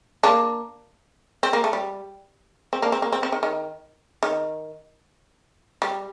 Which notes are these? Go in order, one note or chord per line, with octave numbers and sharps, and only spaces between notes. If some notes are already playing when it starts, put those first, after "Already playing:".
A#3 D4
C4
A#3
A3
G3
C4
A#3 D4
C4
A#3
C4
C4
D#3
D#3
D#3
G3